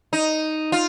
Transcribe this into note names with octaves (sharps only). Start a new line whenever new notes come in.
D#4
F4